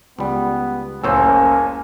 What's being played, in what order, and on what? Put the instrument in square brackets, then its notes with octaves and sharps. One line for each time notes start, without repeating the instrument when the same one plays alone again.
[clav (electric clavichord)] C#2 G3 [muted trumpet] B3
[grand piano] F#1 C#2 E6 [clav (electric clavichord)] A2 C#4 C5 [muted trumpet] A#3 [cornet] G#5